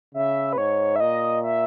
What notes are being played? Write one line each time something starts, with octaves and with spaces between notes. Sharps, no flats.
C#3 E5
B4
G#2 C#5
E5
A#2 D#5
E5